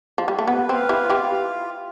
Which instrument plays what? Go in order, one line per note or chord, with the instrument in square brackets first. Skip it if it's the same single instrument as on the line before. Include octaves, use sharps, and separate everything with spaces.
[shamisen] F3
G3
A3
[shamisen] B3 [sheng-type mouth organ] B4
[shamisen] C4
[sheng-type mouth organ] F5
[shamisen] E4 G4
[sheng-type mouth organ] F4
[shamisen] E4 G4